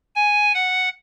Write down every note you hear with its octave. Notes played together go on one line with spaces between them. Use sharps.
G#5
F#5